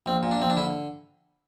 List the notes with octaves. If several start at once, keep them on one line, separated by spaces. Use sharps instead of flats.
A#1 C4
A#2
D4
A#1 C4
D4
D3 E4